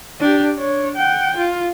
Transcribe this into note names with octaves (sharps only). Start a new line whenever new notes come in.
D4 G4
D4 C#5
F#5 G5
F4